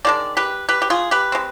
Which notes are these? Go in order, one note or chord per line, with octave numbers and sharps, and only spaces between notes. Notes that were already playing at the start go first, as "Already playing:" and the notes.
D#3 G#3 D4 D5
G4 B4
G4 B4
G4
F4 G#4
G4 B4
G#3 C4